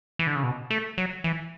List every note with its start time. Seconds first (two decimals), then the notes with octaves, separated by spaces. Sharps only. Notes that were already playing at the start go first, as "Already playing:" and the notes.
0.19 E3
0.27 D3
0.36 C#3
0.43 B2
0.70 A3
0.98 F#3
1.24 E3